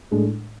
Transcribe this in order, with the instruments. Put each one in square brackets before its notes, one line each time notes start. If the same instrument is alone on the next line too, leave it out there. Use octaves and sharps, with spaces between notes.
[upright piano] A2 G#3 D4